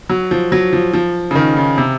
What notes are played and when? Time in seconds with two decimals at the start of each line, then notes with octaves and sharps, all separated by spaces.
0.10 F#3
0.31 F3
0.52 F#3
0.73 F3
0.93 F3
1.31 C#3
1.35 D#3
1.57 C#3
1.78 C3